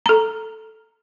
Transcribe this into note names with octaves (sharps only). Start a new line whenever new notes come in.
A4 A#5